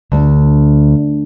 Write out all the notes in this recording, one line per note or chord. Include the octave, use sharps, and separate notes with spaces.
D2